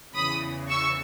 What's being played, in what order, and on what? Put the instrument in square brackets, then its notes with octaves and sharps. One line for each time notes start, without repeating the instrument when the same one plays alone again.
[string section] E2 C#3 E3 B5 D#6
C#6 E6